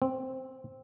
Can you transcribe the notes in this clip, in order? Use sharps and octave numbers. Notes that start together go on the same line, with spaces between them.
C4